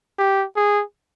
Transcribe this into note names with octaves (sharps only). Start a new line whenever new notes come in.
G4
G#4